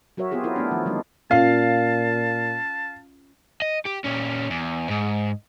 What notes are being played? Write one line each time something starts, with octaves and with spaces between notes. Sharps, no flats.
F#3 F#4 A#4 C#5 E5
B3 C4 F4 G4 G#4
E4 F4 A#4
A3 B3 D4
D#3 F3 A3
D3 F3 G3 G#3 D#4
A#2 C#4 F4 F5 A5
D#5
G4
A#2 C#4
E2
G#2